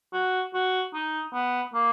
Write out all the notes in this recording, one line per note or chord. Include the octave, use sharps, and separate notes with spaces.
F#4
F#4
D#4
B3
A#3